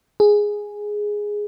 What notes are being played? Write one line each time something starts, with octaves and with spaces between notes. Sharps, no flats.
G#4